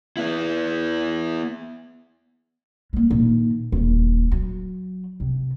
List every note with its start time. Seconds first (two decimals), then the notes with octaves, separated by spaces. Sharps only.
0.17 B3 E4
2.93 G#3 A#3
3.11 A#2 D#3
3.72 D#1 E2
4.32 F#3
5.20 C3